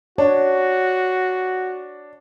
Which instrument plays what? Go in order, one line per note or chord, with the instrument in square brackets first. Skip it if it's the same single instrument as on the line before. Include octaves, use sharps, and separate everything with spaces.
[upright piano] D4 [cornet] F#4 [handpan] C#5